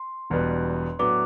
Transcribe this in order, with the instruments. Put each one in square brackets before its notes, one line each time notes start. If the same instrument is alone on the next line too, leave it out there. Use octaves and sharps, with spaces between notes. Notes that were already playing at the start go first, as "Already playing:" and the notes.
Already playing: [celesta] C6
[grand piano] E1 E2 B2 G3 B3
[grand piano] A2 F#3 B3 D4 [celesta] D6